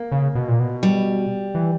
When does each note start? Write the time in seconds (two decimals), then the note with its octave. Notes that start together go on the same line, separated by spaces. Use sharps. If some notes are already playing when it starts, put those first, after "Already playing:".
Already playing: A#3
0.12 C#3
0.35 B2
0.48 A#2
0.60 B2
0.83 G3
1.55 E3